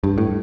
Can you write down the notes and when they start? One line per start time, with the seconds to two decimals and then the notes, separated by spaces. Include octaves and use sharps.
0.04 G2
0.18 A2